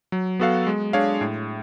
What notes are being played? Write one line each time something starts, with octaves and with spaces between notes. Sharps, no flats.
F#3
B3 F#4 A4 F5
G#3
D4 G#4 C#5 F5
A2